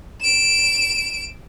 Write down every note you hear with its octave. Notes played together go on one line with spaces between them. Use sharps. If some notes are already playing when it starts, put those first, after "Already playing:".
D7 E7